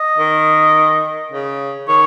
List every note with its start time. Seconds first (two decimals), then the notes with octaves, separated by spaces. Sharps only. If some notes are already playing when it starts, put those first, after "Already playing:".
Already playing: D#5
0.18 D#3
1.32 C#3
1.88 D#3 C#5